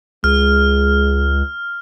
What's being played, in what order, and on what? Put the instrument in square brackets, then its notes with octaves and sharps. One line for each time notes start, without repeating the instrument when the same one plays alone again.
[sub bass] C#2 [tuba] G#3 [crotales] F6